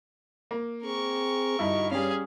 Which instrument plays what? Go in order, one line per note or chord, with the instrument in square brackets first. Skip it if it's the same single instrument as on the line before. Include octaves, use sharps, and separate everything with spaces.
[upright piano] A#3
[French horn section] C4 G#4 [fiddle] A#4 C#6
[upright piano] G2 D#4 E4 [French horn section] D3 F#4 D#5
[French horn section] G2 C#5 [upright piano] G3 C#4 [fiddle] G#4 F5